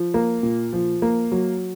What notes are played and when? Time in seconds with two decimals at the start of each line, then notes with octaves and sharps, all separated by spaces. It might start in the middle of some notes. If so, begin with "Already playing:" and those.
Already playing: F3
0.14 A#3
0.43 A#2
0.73 F3
1.02 A#3
1.32 F#3